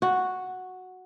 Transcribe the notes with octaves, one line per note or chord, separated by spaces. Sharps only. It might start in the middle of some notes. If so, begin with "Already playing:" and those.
F#4